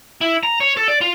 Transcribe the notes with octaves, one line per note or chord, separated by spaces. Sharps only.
E4
A#5
C#5
A4
D5
F4